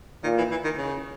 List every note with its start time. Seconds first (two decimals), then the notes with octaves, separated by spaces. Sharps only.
0.24 A#2 D#3
0.38 E3
0.51 E3
0.64 D#3
0.78 C#3